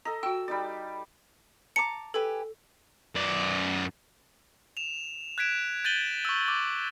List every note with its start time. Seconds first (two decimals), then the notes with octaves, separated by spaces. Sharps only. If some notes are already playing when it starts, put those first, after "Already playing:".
0.05 A4 D#5 A#5
0.23 F#4 G5 E6
0.48 G3 D#4 D5
1.76 A5 A#5 D6 C#7
2.14 G4 A4 B4 G#5
3.16 F#2 D5
4.77 E7 F7
5.38 F#6 G#6 B6 D7 E7
5.84 G6 A6 D#7 F#7 G7
6.25 C#6 E6
6.48 D6